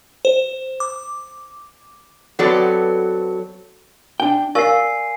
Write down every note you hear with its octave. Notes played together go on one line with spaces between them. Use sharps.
C5
D6
F#3 B3 C4 A4 B4 D5
D4 G5
A#4 D5 F5 G#5 C#6 C7